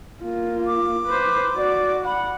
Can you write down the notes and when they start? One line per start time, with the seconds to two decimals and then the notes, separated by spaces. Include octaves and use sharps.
0.22 A#3 F4
0.67 D6
1.06 B4 C5
1.56 F#4 D5
2.05 F#5 B5